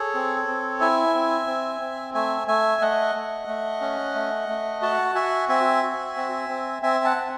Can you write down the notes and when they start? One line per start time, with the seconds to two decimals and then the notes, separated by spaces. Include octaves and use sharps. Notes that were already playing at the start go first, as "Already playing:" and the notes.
Already playing: G#4 A4 C#5
0.14 C4
0.48 C4
0.80 E4 E5 G#5
1.14 C4
1.47 C4
1.81 C4
2.14 A3 E5 G#5
2.48 A3 E5 G#5
2.81 A3 D#5 F#5
3.15 A3
3.48 A3
3.81 C#4
4.15 A3
4.49 A3
4.82 F#4 F#5 A5
5.15 F#4 E5 G#5
5.49 C4 E5 G#5
5.83 F#4
6.16 C4
6.49 C4
6.82 C4 E5 G#5
7.05 F#5 A5
7.17 C4